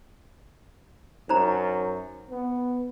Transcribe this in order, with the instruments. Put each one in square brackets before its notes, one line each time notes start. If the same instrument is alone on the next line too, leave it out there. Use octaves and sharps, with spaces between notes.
[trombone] F#2 [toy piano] D#4 C5 A#5
[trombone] B3